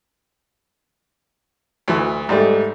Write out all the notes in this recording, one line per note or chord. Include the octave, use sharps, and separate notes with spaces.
D2 E3
G#2 G3 A3